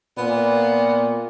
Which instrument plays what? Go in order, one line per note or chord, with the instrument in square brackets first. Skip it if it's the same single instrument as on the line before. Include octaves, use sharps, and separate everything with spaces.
[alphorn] A#2 [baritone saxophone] B3